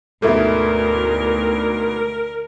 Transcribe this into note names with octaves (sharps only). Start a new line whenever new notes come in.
D2 G#2 B2 E4 A4 A#4 E5